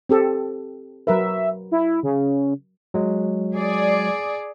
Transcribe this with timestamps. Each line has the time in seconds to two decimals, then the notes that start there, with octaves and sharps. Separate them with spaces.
0.09 C4 G4 A4
1.07 F#3 A#4 B4 E5
1.72 E4
2.03 C#3
2.94 F#3 G#3
3.54 G#4 D5